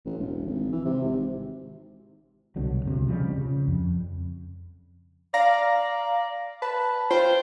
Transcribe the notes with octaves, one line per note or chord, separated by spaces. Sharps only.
A1
E1
G#1
E3
C3
G#1
C2 B2 D3 F#3
E1 D2 C3
C#3 F3 G3 G#3
C#3
F2
D5 F5 A#5 A#6
B4 A5
F4 C5 G5